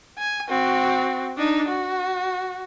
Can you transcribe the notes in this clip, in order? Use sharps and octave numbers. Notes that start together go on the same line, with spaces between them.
G#5
C4 F#4
D4 D#4
F#4